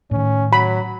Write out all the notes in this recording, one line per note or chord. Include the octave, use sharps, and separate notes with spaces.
A2 D#3 C#4
F#3 B5